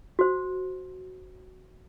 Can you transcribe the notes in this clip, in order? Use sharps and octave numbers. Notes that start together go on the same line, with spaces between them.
F#4 C5